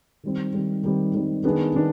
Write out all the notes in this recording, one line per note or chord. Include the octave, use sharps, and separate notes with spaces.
D#3 G3 C4
D#3 G3 C4
D#3 G3 C4
D#3 G3 C4
D#3 B3 D4 G#4
D#3 B3 D4